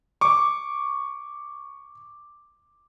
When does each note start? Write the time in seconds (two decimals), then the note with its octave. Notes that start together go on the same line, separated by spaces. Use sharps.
0.21 C#6 D6